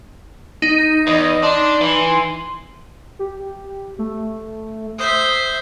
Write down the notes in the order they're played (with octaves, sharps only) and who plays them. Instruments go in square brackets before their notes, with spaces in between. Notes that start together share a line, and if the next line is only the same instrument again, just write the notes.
[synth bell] D#4
[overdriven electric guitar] E2 [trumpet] D#5
[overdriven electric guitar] D4 [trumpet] C6
[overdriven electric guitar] E3
[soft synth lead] G4
A3
[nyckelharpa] C5 E5 [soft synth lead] D#6